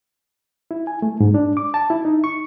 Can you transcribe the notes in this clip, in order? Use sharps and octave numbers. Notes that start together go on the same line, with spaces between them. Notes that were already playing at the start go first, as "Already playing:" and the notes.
E4
G#5
A3
G#2
D4
D6
A5
E4
D#4
C#6